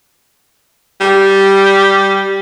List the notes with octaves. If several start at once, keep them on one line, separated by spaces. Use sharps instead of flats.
G3